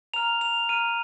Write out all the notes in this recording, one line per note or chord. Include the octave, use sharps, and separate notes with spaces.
A#5 F6 F7
F7
A#5 F6 D#7